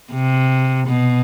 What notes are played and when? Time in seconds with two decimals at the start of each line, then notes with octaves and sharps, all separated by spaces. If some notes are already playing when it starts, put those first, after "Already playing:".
0.11 C3
0.87 B2